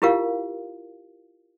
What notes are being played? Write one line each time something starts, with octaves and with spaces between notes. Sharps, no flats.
E4 F4 G4 A#4 F5